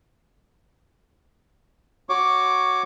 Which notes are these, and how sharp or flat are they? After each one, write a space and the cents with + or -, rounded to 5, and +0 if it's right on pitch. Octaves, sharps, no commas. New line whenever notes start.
F#4 +0 C#5 +0 D6 +0